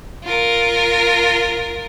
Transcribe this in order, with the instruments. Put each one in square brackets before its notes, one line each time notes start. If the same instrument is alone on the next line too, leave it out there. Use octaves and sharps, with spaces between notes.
[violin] F4 A#4